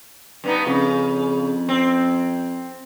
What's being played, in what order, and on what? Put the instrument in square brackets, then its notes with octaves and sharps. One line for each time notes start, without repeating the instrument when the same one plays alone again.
[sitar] G2 B3 D#4
[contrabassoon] F2 [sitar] C#3
[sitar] C4